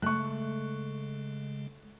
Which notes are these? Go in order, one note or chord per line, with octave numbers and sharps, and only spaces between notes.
C#3 G#3 A3 C#6 F#6